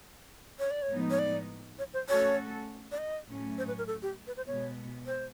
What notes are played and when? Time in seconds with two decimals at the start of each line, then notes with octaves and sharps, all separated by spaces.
0.59 C#5
0.71 D5
0.82 C#5
0.89 A2 F3 G#3 B3 D#4
1.11 C#5
1.19 D5
1.79 C#5
1.94 C5
2.08 A3 C#4 F#4 A4 C#5
2.92 D5
2.98 D#5
3.27 A2 F#3 A3 C#4
3.58 C5
3.67 B4
3.78 A#4
3.87 A4
4.02 G4
4.27 B4
4.37 C5
4.47 B2 G#3 B3 C#5
5.06 C5